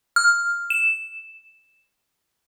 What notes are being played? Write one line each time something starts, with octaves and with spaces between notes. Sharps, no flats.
F6
E7